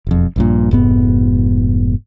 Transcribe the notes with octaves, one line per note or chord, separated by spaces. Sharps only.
E1 F2
A#1 G2 A#2
F1 G#2 B3